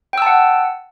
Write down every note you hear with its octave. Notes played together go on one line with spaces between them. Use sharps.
F#5 G5 A5 E6